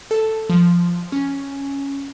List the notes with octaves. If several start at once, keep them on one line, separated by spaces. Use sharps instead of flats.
A4
F3
C#4